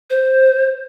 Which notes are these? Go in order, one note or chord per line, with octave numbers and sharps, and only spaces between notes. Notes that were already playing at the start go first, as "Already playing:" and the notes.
C5